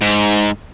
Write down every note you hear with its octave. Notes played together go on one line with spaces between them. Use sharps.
G#2